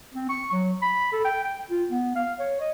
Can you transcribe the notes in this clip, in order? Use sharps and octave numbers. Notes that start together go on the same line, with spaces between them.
C4
C#6
F#3
B5
A4
G5
G5
F4
B3
F5
C#5
D#5